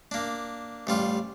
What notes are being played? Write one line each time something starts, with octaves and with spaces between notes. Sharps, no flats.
A#3 D4
A1 G3 F4